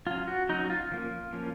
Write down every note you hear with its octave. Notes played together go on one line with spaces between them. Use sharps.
F#3 C#4 F4
F#4
F#3 C#4 D#4
F#4
F4
F3 A#3 C#4
F3 A#3 C#4